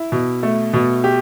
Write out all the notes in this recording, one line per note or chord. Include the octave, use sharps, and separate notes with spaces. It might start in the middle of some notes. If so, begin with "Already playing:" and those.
Already playing: E4
B2
A3
B2
G4